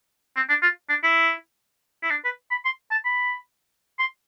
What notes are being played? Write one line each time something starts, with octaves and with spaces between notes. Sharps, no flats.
C4
D4
F4
D4
E4
E4
D4
B4
B5
C6
A5
B5
C6